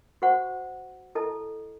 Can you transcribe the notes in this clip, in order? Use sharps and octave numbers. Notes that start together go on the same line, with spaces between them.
F#4 C5 F#5 C#6
E4 A4 D#5 A5